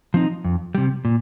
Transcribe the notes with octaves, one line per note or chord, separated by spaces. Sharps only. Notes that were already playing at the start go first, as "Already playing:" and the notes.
F3 C4 D#4
F2
C3 G3
A#2